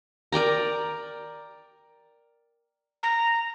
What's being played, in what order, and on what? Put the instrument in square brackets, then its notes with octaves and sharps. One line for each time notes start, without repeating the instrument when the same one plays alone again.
[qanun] A#4 D5 G5 A#5
[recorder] A#5